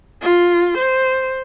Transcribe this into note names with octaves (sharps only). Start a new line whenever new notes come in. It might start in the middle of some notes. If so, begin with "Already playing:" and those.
F4
C5